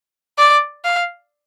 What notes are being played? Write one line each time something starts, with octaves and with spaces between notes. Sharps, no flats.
D5
F5